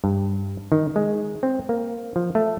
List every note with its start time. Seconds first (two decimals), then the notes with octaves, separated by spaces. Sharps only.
0.04 G2
0.72 D#3
0.96 G#3
1.43 C4
1.69 A#3
2.16 F3
2.35 A3